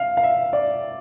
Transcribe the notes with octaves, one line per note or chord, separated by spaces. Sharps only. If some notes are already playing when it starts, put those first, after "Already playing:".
Already playing: E5 F5
F5
E5
D5